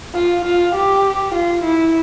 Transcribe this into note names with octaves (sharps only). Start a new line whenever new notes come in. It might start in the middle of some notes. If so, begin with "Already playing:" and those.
F4
F4
G4
F4
E4